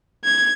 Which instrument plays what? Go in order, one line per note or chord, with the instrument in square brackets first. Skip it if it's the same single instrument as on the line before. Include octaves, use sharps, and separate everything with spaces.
[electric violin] G#6